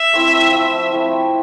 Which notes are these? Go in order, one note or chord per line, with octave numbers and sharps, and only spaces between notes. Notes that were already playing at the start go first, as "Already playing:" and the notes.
Already playing: E5
A3 C4 E4
F3
A3 C4 E4